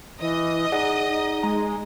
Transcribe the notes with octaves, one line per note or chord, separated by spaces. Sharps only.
E3 D#5
D#4 G#4 D5 F#5
D#4
G#3 A#5